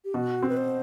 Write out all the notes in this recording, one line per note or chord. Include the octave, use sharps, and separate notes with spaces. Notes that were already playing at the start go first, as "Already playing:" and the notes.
G4
B2 F#4
C4
B4
C5